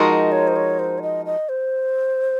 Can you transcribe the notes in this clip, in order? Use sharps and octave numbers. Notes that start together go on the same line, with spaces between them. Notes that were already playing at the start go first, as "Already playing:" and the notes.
Already playing: F3 G#3 D#4 F#4 A#4
D#5
C#5
C5
C#5
C5
C#5
D#5
D#5
C5